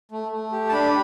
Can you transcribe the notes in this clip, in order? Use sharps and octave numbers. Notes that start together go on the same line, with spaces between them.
A3
A3
G4
A5
D4 B5